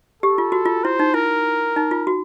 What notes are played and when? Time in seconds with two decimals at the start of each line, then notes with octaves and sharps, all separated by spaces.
0.23 G4 A4
0.38 F4
0.52 F#4
0.66 F4
0.84 E4 C5
1.00 D#4
1.14 E4 A#4
1.76 D#4
1.91 F4
2.07 F#4